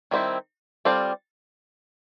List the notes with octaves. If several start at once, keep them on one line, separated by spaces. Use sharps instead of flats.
D#3 G3 C4 E4
G3 C4 F4 A4 D5